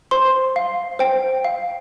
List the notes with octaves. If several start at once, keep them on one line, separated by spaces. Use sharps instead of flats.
C5 C6
F5
C5 G5
F5